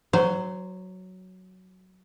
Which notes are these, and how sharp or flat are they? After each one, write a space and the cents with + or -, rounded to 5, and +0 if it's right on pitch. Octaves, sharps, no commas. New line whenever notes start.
F#3 +5 C5 -20